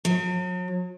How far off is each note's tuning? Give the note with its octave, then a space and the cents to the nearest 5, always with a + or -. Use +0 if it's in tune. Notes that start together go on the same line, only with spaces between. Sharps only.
F#3 -40